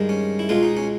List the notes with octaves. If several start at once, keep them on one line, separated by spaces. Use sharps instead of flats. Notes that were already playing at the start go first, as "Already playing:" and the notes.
Already playing: G2 D#3 G#3
C#4
E4
C#2 B2 G#3 F4
D#4
C#4